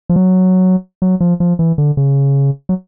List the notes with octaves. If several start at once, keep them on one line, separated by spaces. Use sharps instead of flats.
F3
F#3
F#3
F3
F3
E3
D3
C#3
F#3